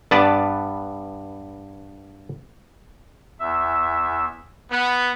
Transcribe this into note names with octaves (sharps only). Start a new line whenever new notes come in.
G2 B3 B4 D5 A5
E2 E5
B3